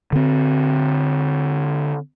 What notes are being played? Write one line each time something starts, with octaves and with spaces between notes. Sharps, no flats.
D3 C4